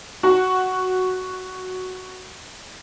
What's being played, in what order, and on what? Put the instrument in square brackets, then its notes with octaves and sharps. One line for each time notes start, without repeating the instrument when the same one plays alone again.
[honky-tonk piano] F#4 F#5